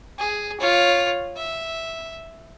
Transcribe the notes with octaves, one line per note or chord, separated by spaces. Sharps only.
G#4
F4 C#5
E5